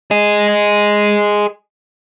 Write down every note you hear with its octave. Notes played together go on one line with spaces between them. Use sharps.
G#4 D#5